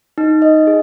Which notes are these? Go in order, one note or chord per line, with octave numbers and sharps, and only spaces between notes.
D#4
D#5
G#4